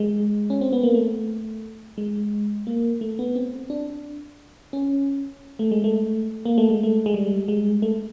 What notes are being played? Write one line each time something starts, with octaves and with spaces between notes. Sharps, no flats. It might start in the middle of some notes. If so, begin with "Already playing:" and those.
Already playing: G#3
C#4
C4
B3
A#3
A3
G#3
A#3
A3
B3
C4
D4
C#4
A3
G#3
A3
A#3
A3
G#3
A3
G#3
G3
G#3
A3